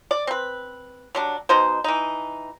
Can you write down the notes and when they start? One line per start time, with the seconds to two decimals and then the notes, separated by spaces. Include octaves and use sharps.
0.11 D5
0.27 C4 B4
1.15 F#3 G3 D4
1.49 B2 D#4 C5
1.84 E3 D#4